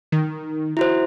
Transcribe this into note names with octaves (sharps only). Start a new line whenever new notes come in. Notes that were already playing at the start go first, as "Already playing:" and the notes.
D#3
E4 F#4 C5